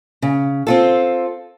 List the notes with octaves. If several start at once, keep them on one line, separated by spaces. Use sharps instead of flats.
C#3
C4 F4 A4